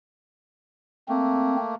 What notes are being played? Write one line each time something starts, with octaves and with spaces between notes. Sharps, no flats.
A3 A#3 C4